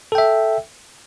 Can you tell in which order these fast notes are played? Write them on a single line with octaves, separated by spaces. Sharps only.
A4 G5 E5